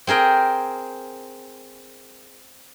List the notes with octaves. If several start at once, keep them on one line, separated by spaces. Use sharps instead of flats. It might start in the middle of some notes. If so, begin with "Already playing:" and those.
C4 G#4 A#4 G5